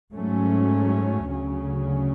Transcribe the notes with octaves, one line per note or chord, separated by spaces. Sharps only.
G#2 F#3 A3 C#4
D2 C#3 F#3 C#4